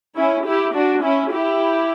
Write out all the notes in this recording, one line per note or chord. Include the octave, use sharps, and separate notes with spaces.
C#4 E4
E4 G4
D4 F#4
C#4 E4
E4 G4